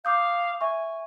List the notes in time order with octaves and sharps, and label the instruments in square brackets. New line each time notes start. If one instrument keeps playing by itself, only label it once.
[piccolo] F5 [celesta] D6 D#6 G6
[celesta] E5 C#6 [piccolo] G#5